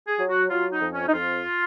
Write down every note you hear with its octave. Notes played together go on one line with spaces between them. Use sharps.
G#4
F#3
F#4
F#3 F4
D#4
F2
C#4
D#4
F2 F4